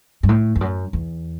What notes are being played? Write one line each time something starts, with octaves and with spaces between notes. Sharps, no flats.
G2
A2
E2
F#2
E2